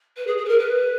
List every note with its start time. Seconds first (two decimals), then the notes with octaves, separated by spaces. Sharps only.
0.17 B4
0.27 G#4
0.37 G#4
0.45 B4
0.48 A#4
0.58 B4